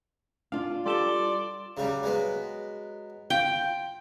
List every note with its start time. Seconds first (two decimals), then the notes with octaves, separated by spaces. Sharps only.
0.52 D4 F4 F5
0.86 G3 G4 A4 D5 C6 E7 G7
1.77 C#3 F#3 G3
2.03 F#3 G#3 B3
3.30 F4 G5